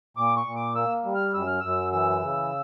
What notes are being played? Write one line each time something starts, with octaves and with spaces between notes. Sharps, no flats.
A#2 D6
C#6
A#2
D6
A#3 E6
G3
F6
F#2 E6
F6
F#2 E6
E3 E6
C#3